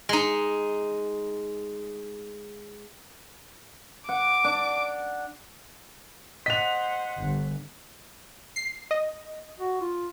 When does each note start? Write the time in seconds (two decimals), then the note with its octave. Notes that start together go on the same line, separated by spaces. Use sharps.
0.09 G#3 D#4
4.09 F#5 D6
4.44 D4
6.46 C5 D#5 F#5 F#6 B6 F7
7.19 G1
8.56 C7
8.91 D#5
9.60 F#4
9.81 F4